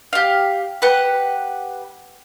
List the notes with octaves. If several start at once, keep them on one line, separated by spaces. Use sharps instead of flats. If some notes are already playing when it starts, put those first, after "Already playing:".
G4 F5
G4 B4 F#5